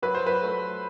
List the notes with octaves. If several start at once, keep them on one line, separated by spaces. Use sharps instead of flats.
F#3 B4
C5
B4
A3